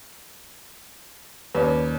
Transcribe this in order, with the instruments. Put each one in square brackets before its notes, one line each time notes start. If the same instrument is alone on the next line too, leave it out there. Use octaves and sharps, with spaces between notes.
[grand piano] D#2 C#4 [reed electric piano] B4 D5